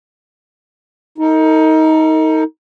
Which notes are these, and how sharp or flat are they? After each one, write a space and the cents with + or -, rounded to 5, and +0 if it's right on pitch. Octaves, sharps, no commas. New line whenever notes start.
D#4 +25 A#4 -45